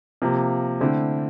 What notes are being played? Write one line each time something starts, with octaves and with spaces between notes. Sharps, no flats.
C3 F3 A#3
D3 A3 C4 E4